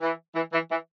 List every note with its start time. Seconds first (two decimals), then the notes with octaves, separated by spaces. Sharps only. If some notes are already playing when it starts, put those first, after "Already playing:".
0.01 E3
0.35 E3
0.53 E3
0.71 E3